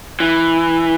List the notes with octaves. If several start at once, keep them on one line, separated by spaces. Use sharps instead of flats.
E3